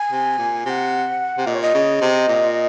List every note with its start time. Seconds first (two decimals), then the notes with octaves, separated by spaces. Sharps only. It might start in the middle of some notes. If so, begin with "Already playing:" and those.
Already playing: G#5
0.12 C3
0.38 A#2
0.65 C3 F#5 G#5
1.38 C3
1.46 A#2 D#5
1.54 C#5
1.62 D#5
1.74 C#3
2.01 C3
2.28 A#2